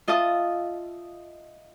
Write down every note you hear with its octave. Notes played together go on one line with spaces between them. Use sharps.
F4 D#5 E5 A5 D#6